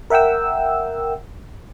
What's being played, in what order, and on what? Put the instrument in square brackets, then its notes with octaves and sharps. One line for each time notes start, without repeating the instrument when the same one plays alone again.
[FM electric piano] A#4 E5 F#5 G5 E6